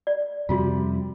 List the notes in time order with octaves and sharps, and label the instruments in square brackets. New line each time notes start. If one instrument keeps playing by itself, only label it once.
[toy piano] D5
[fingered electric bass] F2 C3 G3 [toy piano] F4 F#4